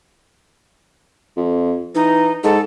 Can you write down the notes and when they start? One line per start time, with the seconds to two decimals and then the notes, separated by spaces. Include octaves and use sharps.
1.37 F2
1.95 E3 D#4
2.44 G#2 A4